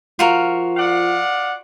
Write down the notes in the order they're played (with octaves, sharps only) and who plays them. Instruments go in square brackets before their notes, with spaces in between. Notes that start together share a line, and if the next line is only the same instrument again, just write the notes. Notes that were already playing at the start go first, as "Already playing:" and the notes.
[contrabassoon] F3 [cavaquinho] F4 F#4 A#4
[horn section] D5 F5 F#5